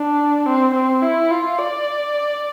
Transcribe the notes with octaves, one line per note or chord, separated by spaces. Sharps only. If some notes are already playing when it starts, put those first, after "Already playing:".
Already playing: D4
C4
C4
E4
F4
D5